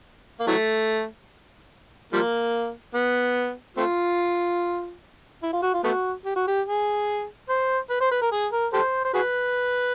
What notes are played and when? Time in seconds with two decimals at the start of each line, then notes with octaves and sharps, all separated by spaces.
0.40 A#3
0.47 E3 F#3 A3
2.13 F3 G3 A#3
2.95 B3
3.77 A3 C4 F4
5.43 E4
5.53 F4
5.63 F#4
5.74 F4
5.84 A3 B3 F#4
6.25 G4
6.36 F#4
6.48 G4
6.66 G#4
7.49 C5
7.90 B4
8.01 C5
8.11 B4
8.22 A#4
8.32 G#4
8.52 A#4
8.73 G4 A4 C5
9.05 C5
9.14 F#4 G#4 B4